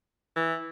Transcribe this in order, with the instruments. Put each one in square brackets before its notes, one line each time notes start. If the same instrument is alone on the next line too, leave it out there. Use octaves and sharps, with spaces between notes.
[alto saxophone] E3